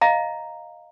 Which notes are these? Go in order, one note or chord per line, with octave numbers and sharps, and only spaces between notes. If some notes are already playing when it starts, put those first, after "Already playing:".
D#5 F5 A#5